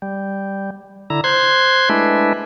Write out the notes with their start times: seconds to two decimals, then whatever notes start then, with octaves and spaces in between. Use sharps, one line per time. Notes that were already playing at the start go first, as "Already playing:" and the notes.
0.02 G3
1.10 D3 E4 A#5
1.24 C5 C6 F#6 G#6
1.89 G#3 A3 D4 E4 B4